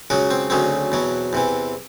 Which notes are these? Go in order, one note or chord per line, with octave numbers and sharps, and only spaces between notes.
C#2 C#3 F#3 F#4
C4
D2 C#3 F#3 C4
E2 B2 F#3
E2 C3 E3